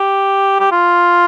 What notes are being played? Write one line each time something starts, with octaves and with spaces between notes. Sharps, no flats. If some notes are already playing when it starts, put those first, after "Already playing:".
Already playing: G4
G4
F4